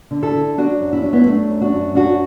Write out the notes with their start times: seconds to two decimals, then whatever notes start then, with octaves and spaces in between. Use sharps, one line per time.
0.11 D3
0.23 E4 A4
0.35 D3
0.58 F#3 D4 F#4
0.80 F#2
0.93 E4
1.02 F#3 D4
1.13 B3 E4
1.26 F#3 A3 D4
1.50 F#2
1.61 D4 F#4
1.73 F#2
1.95 F#2 D4 F#4